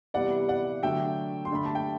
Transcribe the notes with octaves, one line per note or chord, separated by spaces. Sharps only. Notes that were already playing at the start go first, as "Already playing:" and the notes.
C3 E3 G3 B3 D5 F#5
D5 F#5
D3 F#3 A3 D4 E5 G5
C6
D3 A3 D4 B5
A5
G5